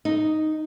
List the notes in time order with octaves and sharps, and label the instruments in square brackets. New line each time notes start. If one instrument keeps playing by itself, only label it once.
[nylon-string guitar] D#4